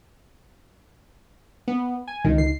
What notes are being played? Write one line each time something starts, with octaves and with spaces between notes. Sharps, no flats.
B3
G#5
C#2 D#3 D#4
C7